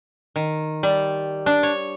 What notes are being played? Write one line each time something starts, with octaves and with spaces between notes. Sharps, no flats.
D#3
G3
D4
C#5